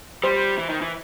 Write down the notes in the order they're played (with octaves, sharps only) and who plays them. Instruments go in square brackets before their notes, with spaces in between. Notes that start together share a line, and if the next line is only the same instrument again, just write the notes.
[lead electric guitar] G3 [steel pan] C5
[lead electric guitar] E3
D#3
E3